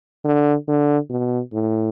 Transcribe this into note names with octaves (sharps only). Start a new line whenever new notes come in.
D3
D3
B2
A2